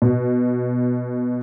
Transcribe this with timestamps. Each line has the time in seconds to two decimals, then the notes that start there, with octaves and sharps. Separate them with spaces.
0.02 B2